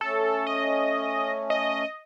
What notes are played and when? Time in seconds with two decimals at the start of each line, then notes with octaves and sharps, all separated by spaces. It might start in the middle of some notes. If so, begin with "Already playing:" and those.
0.01 A3 C#4 A4
0.47 D#5
1.50 D#5